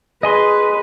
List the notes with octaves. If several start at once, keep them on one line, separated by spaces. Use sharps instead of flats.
G#4 B4 D#5 G#5 C6